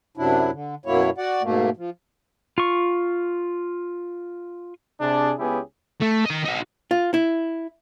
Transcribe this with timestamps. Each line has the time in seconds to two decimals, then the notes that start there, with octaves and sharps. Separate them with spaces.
0.17 F#2 C3 F#3 D4 E4
0.52 D3
0.86 F#2 B2 F#3 A#3 E4 C#5
1.18 F#4 D5 F#5
1.42 G#2 B2 A3 A#3
1.77 F3
2.58 F4 C#6
5.01 C3 D4 G#4
5.39 C#2 B3 C#4 E4 G4 G#4
6.02 A3
6.26 D#3 D#5
6.45 D#4 F#4
6.91 F4
7.14 E4